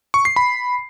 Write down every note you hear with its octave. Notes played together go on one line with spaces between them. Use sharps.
C#6
C7
B5